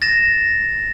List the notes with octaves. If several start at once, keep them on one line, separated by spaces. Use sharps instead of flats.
A6 A#6 E7